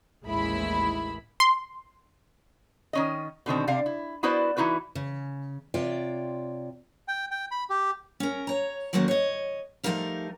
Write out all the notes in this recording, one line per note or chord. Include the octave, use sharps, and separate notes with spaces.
A1 D#2 G#3 E4 B5
C6
D#3 C#4 D#5
B2 D3 D#3 C4
C3 D4 F5
E4
B3 E4 F#4 B4 C5 D5
E3 D#4 E4 F#4 B4
C#3
C3 F4 C#5 D5 G5
G5
G5
B5
G4
C#4 A#4
C#5 A#5
D#3 F3 F#3 A3 A#3 C#4
C#5 D#5
F3 A3 D#4 G4 A#4 F5